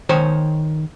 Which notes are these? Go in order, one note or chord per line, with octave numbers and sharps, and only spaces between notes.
D#3 C5 C#5